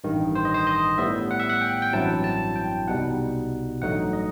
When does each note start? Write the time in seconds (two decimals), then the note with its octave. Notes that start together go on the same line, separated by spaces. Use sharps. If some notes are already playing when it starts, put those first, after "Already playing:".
0.04 A1 G2 D#3
0.35 C5
0.45 D#5
0.54 C5
0.67 D#5
0.98 A2 G3 B3 E5
1.31 F#5
1.40 E5
1.49 F#5
1.62 G5
1.82 G5
1.93 A1 G2 F#3 C4 E4 A5
2.24 A5
2.56 G5
2.87 C2 B2 G3 D#4 F#5
3.81 A1 G2 F#3 A3 D#4 F#5
4.13 D#5